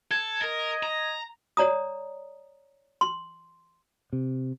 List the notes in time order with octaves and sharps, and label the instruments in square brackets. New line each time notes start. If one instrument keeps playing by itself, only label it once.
[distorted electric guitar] A4 [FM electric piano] G#6
[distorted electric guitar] A#4 [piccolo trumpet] D#5
[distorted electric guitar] A#5
[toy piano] C#5 D5 A#5 D#6
C6
[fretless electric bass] C3